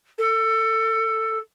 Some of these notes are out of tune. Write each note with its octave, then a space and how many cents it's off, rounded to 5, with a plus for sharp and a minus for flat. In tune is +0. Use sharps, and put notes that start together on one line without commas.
A4 +20